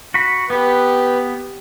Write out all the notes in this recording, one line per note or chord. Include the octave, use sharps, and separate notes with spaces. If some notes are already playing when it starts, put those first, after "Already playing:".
F#4 B5
B3 G4 B4